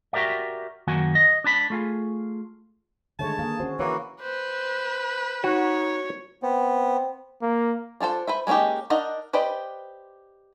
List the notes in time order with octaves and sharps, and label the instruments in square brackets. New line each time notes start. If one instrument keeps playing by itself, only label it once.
[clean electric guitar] F#4 G4 A#4 D5 E5
F#2 D#3 A#3 F#4 G#5
D#5
D4 A5 B5
A3 F4 G#4
[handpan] D3 D#3 C#5 [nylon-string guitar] G#3 A3 [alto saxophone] A5
[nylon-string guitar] A#3 [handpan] G#4
[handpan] C#4 F#4 [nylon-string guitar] C5
[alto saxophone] E3 [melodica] A#3 F#4 [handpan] E4 [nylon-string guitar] C#5
[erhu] B4 [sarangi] C5
[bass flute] D#4 [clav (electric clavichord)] F#4 [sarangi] C#5
[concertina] B3 [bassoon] C4
[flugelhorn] A#3
[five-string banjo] D4 F4 A4 C5
B4 C5 E5
G#3 A#3 C#4 D#4 G4
D4 D#4 A#4 D#5 F#5
G4 B4 C5 D5 D#5